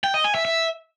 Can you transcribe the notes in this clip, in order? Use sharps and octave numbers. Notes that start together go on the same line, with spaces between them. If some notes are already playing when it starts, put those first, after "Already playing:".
G5
D#5
G#5
E5
E5